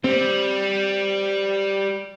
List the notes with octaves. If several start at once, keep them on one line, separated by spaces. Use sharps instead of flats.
G3 C4